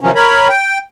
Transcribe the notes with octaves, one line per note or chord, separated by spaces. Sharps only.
C3 D#3 F3 F#3 C#4
A#4 C#5 B5
G5